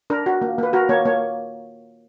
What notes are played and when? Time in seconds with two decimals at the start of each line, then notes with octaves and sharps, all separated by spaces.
0.10 D4 A#4
0.26 F#4
0.42 A#3
0.58 A#3 B4
0.73 F#4 A#4
0.89 A#3 C#5
1.05 A#3 C#5